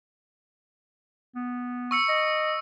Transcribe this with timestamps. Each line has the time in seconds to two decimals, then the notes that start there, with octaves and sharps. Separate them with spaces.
1.35 B3
1.91 C#6 E6 C#7
2.09 D#5